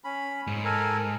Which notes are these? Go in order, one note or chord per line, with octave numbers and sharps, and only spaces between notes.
C#4 B5
G#2
A4 A#4 G#5